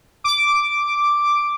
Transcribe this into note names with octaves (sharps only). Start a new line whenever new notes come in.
D6